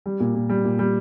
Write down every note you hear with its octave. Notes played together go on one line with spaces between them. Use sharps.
G3
A#2
A#2
G3
A#2
G3